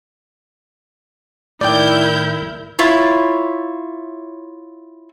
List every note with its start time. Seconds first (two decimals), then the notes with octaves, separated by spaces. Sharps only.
1.61 A2 D#3 E4 A#4 D5 G5 G6
2.79 E4 F4 C#5